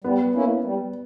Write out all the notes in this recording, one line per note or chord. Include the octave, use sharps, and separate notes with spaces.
G3 B3
A#3 C#4 E4
G3